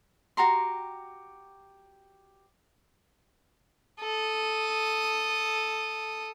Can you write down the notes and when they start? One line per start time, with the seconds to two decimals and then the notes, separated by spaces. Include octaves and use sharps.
0.37 F#4 G4 A#5 C6
4.00 A4 D#6